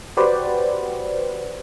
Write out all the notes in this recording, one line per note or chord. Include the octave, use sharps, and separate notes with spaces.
F#4 G4 B4 C5 D5